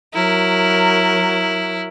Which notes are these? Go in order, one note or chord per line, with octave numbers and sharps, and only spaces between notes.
F#3 E4 A#4